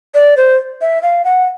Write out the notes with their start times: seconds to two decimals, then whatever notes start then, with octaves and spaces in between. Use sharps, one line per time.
0.14 D5
0.37 C5
0.81 E5
1.03 F5
1.25 F#5